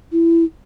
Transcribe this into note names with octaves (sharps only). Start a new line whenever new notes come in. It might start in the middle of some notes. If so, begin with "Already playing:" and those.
E4